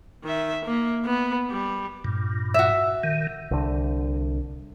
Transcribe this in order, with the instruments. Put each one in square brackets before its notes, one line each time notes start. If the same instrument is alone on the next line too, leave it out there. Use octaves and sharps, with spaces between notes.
[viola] D#3 E5
A#3
B3
G3
[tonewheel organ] G2 A#2
[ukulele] F#4 E5
[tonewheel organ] D#3
[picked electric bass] C2 D3